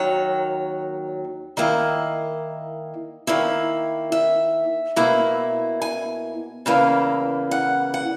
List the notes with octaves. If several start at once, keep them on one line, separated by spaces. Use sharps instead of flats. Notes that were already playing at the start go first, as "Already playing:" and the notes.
Already playing: D#2 D#3 F#3 C#5
D#3 A#3 E4 D#5
D#3 A#3 E4
E5
B2 A#3 E4
G#5
E2 C#3 E3 A#3
F#5
F#5